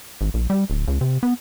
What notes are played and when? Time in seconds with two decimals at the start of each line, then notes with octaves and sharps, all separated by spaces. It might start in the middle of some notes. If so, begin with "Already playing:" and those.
0.21 G#1
0.34 A#1
0.50 G3
0.70 D1
0.88 C#2
1.01 C3
1.23 B3